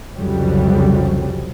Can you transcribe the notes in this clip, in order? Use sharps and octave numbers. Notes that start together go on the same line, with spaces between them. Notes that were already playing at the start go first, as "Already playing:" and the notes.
C2 F2 C#3 F#3 G3